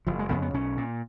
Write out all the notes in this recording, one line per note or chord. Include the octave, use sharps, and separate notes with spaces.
F#1 F3
G#3
F2 C#3 B3
B3
B1 C#4
A#2